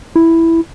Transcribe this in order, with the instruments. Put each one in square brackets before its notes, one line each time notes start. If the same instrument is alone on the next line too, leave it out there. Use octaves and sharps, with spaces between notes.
[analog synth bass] E4